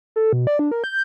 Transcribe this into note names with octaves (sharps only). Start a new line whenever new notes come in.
A4
B2
D5
D4
A#4
G6